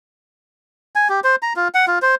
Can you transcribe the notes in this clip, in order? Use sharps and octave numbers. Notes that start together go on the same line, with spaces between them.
G#5
G4
C5
A#5
F4
F#5
F4
C5